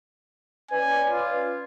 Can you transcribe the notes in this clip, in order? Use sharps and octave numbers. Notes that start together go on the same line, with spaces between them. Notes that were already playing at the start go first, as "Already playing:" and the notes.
C#4 B4 D5 G#5
F4